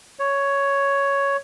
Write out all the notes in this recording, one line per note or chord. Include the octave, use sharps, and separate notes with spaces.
C#5